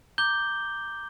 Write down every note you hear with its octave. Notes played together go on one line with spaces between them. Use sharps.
A#5 D6 G6 G7